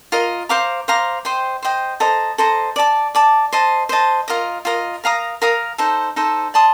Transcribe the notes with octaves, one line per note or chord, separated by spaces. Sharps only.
F4 A#4 D#5
C5 F5 A#5 D6
C5 F5 A#5 D6
C5 D#5 G5
C5 D#5 G5
A4 C5 D#5 A#5
A4 C5 D#5 A#5
D5 A5 D6
D5 A5 D6
C5 D#5 A5
C5 D#5 A5
F4 A#4 D#5
F4 A#4 D#5
A#4 F5 A#5 D#6
A#4 F5 A#5 D#6
D#4 A4 C5
D#4 A4 C5
D5 A5 C6 D#6